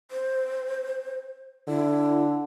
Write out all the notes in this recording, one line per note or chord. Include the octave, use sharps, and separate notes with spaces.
C5
D3 E4